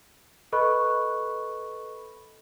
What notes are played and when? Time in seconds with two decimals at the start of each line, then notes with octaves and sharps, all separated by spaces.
0.52 A4 B4 D#5 B5 C#6 F#6